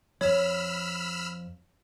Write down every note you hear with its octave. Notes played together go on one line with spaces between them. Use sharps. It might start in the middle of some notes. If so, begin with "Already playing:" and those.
F2 F3 C#5 B5 E6 F6